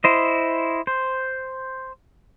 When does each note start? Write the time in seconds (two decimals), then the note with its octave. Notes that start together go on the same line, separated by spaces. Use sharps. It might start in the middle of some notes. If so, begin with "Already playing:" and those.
0.04 E4 C5 D#5
0.87 C5